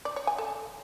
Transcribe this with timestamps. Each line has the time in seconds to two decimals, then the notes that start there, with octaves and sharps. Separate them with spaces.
0.05 D5
0.16 C#5
0.27 G#5
0.38 A4